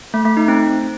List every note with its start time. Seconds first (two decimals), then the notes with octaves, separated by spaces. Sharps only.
0.14 A3
0.25 A3
0.37 D#4
0.48 C4